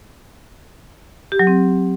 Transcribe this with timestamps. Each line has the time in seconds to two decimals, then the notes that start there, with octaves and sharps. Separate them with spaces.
1.32 G4
1.39 F#3
1.47 C4